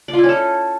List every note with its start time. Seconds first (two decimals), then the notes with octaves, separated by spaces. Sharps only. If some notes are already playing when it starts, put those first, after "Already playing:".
0.08 D5
0.13 F4
0.18 E4
0.24 C#4
0.29 A4